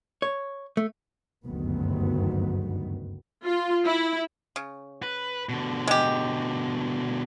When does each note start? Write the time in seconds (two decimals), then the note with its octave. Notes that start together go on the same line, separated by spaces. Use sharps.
0.22 C#5
0.77 A3
1.46 F#1 D2 G2 D#3 F#3 B3
3.45 F4
3.86 E4
4.56 C#3
5.03 B4
5.49 B2 D3
5.87 G#3 G4